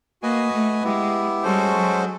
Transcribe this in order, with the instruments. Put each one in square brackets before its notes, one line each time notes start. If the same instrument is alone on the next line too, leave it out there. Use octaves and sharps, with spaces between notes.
[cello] A#3 [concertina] F#4 B4 D#5 G#5
[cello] A3
[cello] G#3 [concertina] B3 E4 G4
[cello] G3 [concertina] G#3 C#4 F#4 A4 C5
[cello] F#3